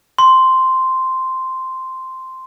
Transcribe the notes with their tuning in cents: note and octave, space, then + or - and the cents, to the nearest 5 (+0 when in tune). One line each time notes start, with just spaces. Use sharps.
C6 -5